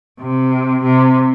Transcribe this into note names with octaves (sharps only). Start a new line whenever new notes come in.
C3
C3